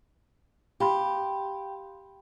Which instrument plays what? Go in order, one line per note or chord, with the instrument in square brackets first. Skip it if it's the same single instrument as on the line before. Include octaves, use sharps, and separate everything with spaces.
[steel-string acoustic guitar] G4 [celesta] F5 B5 C6